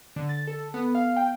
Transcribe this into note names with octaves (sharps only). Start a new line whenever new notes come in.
D3
A6
A4
B3
F5
G5